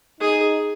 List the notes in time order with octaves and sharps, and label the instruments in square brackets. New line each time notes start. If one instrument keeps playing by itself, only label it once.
[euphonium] D#4 [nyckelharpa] G#4